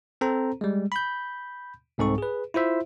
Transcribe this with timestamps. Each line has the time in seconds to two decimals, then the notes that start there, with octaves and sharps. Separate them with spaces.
0.21 C4 A4 C5 A#5
0.61 G3 G#3
0.92 B5 G6
1.98 C2 G#2 C4 A4 C#6
2.18 G#4 B4
2.54 E4 F4 C5 E5